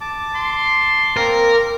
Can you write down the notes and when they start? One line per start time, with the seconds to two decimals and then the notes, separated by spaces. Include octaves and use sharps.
0.01 A5 D6
0.35 C6
1.17 A#3 C4 A#4